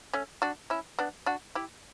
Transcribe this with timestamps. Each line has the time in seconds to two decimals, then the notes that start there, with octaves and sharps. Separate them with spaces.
0.13 A3 C#4
0.42 D4 F#4
0.70 C#4 E4
0.99 B3 D4
1.26 D4 F#4
1.55 E4 G4